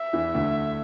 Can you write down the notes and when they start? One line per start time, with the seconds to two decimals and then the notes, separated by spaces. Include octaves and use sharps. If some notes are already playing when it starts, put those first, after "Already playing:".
Already playing: E5
0.13 E2 E3
0.35 D2 D3